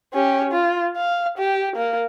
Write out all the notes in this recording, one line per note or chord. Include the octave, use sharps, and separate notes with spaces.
C#4 G4
F4
F5
G4
A#3